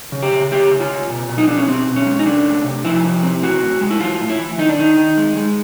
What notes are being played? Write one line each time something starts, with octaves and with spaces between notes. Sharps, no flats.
C#3
G4
C#3
A#3 G4
C#3
F4
C#3
B2
B2
D#4
B2 D4
C#4
B2 C4
B2
C#4
G#3
D#4
C3 D4
A3
C3
F3 E4
C3
C4
E3 F#4
A2
G#3
E4
E3 F4
A2
E4
E3
D#3 D#4
D4
D#3 D#4
D#3
G#3
G#3